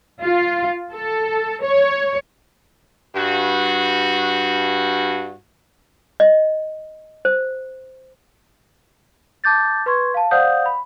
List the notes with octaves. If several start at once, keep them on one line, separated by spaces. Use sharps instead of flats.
F4
A4
C#5
G2 F#4
D#5
C5
A5 D6 G6 A6
B4 C6 C#6 G#6
F5 A5
C5 D5 F5 F#5 D#6 G6
B5